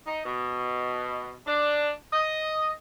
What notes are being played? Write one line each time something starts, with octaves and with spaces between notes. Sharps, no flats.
D#4
B2
D4
D#5